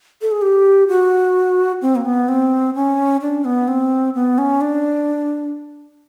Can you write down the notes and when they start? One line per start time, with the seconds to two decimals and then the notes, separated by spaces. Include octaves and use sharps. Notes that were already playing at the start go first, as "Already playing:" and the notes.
0.21 A4
0.32 G#4
0.42 G4
0.88 F#4
1.82 C4
1.96 A#3
2.05 B3
2.28 C4
2.75 C#4
3.21 D4
3.45 B3
3.68 C4
4.15 B3
4.38 C#4
4.61 D4